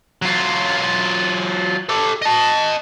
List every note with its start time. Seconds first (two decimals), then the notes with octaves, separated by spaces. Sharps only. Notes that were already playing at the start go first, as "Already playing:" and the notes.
0.22 F#3 F4
1.89 G4 A4
2.22 D#5 A5